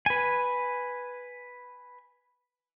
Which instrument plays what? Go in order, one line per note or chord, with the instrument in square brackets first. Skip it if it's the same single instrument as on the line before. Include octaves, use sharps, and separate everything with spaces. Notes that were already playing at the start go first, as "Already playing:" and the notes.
[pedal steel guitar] B4 G#5